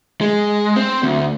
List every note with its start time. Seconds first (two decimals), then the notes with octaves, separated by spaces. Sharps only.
0.21 G#3
0.76 C4
1.03 D2